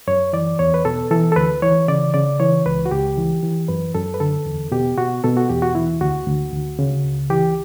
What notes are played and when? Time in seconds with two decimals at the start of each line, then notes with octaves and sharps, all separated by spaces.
0.08 F#2 C#5
0.33 E3 D5
0.59 E2 C#5
0.74 B4
0.85 B2 A4
1.11 E3 A4
1.32 A4
1.36 D2 B4
1.62 E3 C#5
1.88 C#3 D5
2.14 C#3 D5
2.40 E3 C#5
2.66 C#2 B4
2.86 F#4
2.91 C#2 G4
3.18 E3
3.43 E3
3.68 F#2 B4
3.95 F#2 A4
4.14 B4
4.20 D3 A4
4.46 E2
4.72 B2 G4
4.97 B2 F#4
5.24 B2 A4
5.37 F#4
5.49 E2 G4
5.62 F#4
5.75 E3 E4
6.01 D2 F#4
6.26 D2
6.53 D2
6.79 C#3
7.04 C#2
7.30 E3 G4